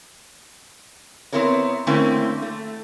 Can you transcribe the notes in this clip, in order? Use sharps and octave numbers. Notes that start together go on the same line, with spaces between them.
B3 C4 E4 A#4 C#5
D3 A3 A#3 C4 C#4 E4
A3